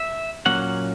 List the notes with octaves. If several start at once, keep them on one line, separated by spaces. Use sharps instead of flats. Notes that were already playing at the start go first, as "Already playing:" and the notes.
Already playing: E5
A#2 F#3 A#3 C#4 F#5